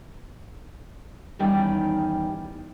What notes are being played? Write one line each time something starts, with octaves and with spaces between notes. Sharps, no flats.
E2 D#3 G3 C#4 D#4 G5